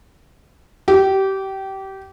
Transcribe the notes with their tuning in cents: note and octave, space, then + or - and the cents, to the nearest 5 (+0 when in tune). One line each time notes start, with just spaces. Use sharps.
G4 -25